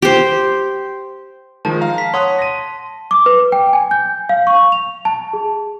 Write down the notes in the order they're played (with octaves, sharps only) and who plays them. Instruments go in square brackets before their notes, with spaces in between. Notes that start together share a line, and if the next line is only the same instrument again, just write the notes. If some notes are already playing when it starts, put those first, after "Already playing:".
[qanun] G4 C5
[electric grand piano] D#3 F3 G#3 [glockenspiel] A5
[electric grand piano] F5 A#5
[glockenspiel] B6
[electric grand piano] C#5 F#5 D#6 [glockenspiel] C6
[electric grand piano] A#6 D#7
[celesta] D6
B4
G5
G#5
G6
F5
C#6
F7
A5
G#4